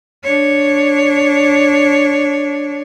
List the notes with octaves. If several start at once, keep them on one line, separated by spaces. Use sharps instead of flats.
D4 C#5